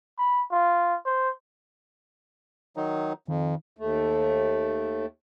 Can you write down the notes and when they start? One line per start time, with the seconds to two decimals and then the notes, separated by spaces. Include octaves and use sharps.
0.18 B5
0.52 F4
1.05 C5
2.77 D#3 F#3 D#4
3.28 F2 D#3
3.77 D#2 A3